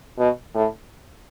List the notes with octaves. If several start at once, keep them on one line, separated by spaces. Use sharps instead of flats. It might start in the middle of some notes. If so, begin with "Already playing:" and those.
B2
A2